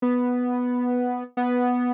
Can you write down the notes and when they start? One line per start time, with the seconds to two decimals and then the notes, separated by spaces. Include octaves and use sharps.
0.02 B3
1.37 B3